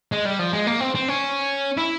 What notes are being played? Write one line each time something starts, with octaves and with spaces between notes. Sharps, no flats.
G#3
G3
F3
G#3
A#3
C4
C4
C#4
E4